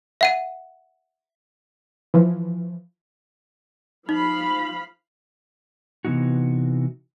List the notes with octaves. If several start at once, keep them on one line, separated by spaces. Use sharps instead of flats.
E5 F#5 D#7
E3 F3
F3 D#4 F5 B5
C3 E3 B3 D#4 F#4